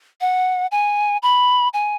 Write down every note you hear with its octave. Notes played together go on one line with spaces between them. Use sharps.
F#5
G#5
B5
G#5